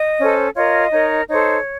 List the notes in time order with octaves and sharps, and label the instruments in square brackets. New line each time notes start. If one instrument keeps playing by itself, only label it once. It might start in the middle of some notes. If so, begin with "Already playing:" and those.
Already playing: [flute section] D#5
C#4 A4 C5
F4 A#4 C#5 D#5
D#4 A#4 C#5
D#4 A4 C5 C#5